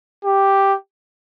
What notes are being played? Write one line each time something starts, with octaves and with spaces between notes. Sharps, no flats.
G4